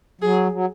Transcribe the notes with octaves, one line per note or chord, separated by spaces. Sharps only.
F#3 G#4
F#3